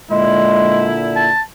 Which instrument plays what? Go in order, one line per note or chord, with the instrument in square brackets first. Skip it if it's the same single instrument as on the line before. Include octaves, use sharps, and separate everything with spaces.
[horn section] A#2 D3 E4 [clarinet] G#3
[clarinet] A5